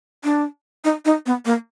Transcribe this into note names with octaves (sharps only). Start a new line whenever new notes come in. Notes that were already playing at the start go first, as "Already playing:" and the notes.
D4
D#4
D#4
B3
A#3